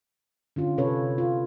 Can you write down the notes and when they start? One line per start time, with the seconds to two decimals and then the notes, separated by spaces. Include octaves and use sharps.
0.56 D3 C#4 F4
0.78 C3 C#4 A4 B4 C#5
1.18 F4